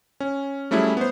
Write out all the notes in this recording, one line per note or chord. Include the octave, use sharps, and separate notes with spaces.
C#4
F#3 G3 A3 C#4 E4 G#4
B3 C5